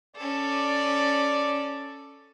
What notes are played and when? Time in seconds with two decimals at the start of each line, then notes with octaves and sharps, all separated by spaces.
0.16 C#4 A4 D5